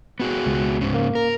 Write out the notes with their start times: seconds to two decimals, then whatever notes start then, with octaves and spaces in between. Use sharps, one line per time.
0.20 B3 F#4 G#4
0.46 C#2
0.81 G#2 C#3
0.94 A#3
1.15 A#4